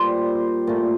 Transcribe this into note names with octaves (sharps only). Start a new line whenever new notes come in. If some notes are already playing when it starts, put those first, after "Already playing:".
Already playing: A#2 G3 C5
A#2 A3